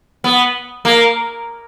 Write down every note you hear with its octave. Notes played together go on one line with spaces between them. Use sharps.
B3
A#3